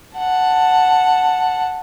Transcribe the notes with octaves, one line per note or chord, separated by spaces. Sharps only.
F#5 A5